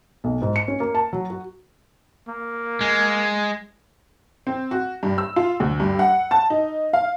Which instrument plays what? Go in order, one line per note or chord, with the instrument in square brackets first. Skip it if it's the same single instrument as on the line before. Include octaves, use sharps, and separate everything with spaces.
[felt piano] B1
G#2
C#7
C#4
A#3
A5
F#3
F#4
[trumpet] A#3
[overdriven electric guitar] G#3
[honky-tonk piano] C4
F#4
G2
E6
F4
D2
G2
F#5
A5
D#4
F5